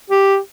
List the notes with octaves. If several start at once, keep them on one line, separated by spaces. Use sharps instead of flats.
G4